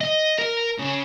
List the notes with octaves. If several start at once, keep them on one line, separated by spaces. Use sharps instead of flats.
D#5
A#4
C#3